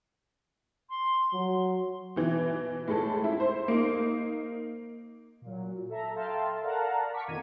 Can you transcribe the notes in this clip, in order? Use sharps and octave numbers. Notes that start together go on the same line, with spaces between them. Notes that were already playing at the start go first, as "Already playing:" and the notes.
C6
F#3
B2 E3
A2 G#3 A4
E4
C5
A#3 D#4
A#2 F#3
A4 E5 A#5
A4 E5 F5 G5 A5 C6
A#4 D5 F5 F#5 A5 A#5
A#5 C#6 D6 B6
F2 A#2 D#3 A#4 G#6 D#7